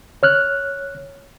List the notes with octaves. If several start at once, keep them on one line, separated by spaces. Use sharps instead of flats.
C#5 F6 F#6